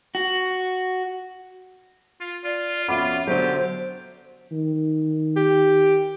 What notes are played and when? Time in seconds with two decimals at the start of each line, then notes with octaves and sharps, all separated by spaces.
0.15 F#4
2.20 F4
2.44 F4 D5
2.88 F2 B2 C#4 F4 E5 F#5 B5 D6
3.27 B2 D3 F#3 G4 C5
4.52 D#3
5.36 G4